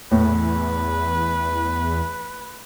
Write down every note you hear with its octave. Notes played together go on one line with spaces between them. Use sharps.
E2 A2 B4